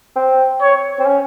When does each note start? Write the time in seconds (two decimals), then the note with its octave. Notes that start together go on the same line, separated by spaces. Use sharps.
0.16 C4
0.61 C#5
0.99 C4
1.06 C#4